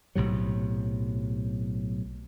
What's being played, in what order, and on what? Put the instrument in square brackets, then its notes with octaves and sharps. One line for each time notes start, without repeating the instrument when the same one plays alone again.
[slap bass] B1 A2 C3 F#3